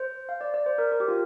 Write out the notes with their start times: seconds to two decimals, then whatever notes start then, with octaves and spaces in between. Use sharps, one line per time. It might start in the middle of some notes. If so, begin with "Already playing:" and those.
Already playing: C5
0.29 F5
0.41 D5
0.54 D5
0.66 C5
0.78 A#4
0.92 A#4
1.00 G4
1.08 F4